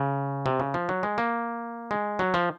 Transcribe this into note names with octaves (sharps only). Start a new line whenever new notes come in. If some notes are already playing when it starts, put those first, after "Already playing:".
Already playing: C#3
C3
C#3
F3
F#3
G#3
A#3
G#3
F#3
F3